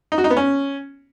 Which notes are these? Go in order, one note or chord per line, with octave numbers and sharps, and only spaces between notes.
D#4
F#4
D#4
B3
C#4